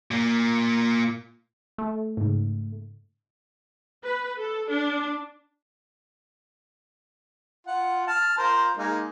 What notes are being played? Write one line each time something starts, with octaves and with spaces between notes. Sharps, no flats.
A#2 A#3
A3
G#2 C#3
B4
A4
D4
F4 F#5
A5 F6
F4 A#4 C5
G#3 A#3 D#4